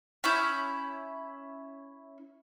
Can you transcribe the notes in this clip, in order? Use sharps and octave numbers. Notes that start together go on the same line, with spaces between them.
C#4 E4 G6